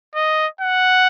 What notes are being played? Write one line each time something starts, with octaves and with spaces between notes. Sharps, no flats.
D#5
F#5